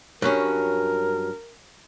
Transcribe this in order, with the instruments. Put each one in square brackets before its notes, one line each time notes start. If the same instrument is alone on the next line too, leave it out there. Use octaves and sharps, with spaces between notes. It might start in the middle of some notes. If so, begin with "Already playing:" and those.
[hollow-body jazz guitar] G2 F#3 C#4 [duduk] A#4